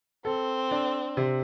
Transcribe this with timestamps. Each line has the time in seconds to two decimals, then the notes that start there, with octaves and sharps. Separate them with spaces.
0.24 C4 A4
0.71 D4
1.17 C3